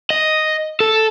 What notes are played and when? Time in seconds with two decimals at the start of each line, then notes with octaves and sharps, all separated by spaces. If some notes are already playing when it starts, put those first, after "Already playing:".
0.10 D#5
0.80 A4